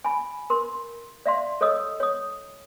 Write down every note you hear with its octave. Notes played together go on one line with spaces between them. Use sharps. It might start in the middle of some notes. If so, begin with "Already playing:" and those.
G#5 B5
A#4 C6
D5 E5 F5 C6
A4 C#5 D#5 D#6 E6
C#5 D#6